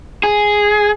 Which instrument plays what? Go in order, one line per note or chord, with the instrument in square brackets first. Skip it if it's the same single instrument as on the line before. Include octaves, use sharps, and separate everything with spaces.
[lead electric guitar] G#4